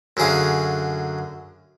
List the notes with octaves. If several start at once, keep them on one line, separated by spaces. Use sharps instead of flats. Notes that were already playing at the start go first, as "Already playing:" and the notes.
F#2 D3 F#3 G#4 F5